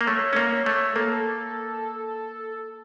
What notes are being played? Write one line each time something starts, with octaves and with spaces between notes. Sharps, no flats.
A#3
A3 C#5
C#4
A#3 C#5
A3 C#5
A#3 A4